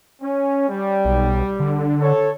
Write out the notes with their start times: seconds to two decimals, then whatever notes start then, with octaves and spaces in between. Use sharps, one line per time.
0.22 C#4
0.69 G3
1.05 B1
1.60 D3
2.01 A4 C#5